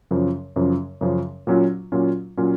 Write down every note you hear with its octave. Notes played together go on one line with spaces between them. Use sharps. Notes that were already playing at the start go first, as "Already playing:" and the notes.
F#2 C#3 F3
F#2 C#3 F3
F#2 C#3 F3
A#2 F#3 C#4 F4
A#2 F#3 C#4 F4
A#2 F#3 C#4 F4